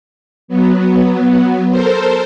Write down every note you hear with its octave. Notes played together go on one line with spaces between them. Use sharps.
F#3 B3
A4 A#4 C5